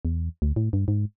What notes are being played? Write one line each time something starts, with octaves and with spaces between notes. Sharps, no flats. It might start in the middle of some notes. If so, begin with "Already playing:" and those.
E2
D2
A2
G2
G#2